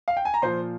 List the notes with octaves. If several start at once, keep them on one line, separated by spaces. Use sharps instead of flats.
F5
G5
G#5
A#5
A#2 F3 C5 C6